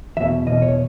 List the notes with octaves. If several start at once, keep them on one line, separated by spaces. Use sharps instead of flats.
E2 B2 E5
E2 B2 D#5
C#5